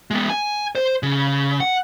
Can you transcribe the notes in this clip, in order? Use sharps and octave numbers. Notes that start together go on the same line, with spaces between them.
G#3 B3
G#5
C5
C#3
F#5